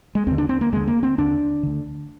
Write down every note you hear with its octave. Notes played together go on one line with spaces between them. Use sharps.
G#3
D#2 D3 C4
D4
C4
A#3
D#2 D3 G#3
A#3
C4
D#2 D3 D4
D2 D3